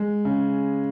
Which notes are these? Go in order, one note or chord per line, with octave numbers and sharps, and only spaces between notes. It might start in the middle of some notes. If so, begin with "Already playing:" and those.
Already playing: G#3
C#3